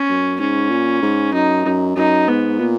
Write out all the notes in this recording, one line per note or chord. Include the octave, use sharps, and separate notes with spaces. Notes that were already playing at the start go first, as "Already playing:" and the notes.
Already playing: C#4
F#2
G#2 C#4
A#2
G#2
F#2 D#4
F#2
F#2 D#4
G#2 B3
A#2